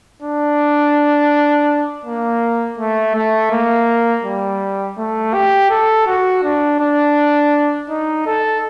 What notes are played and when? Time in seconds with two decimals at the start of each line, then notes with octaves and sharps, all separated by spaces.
0.22 D4
2.05 A#3
2.78 A3
3.15 A3
3.51 A#3
4.24 G3
4.98 A3
5.34 G4
5.70 A4
6.07 F#4
6.44 D4
6.80 D4
7.90 D#4
8.27 A4